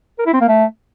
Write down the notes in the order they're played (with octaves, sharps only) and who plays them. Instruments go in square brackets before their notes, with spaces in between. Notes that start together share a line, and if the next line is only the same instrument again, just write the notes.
[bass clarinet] A#4
E4
C4
A#3
A3